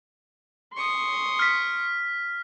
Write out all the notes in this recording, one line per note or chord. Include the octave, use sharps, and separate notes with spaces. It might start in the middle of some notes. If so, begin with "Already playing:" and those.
C6 C#6 D#6
F6 B6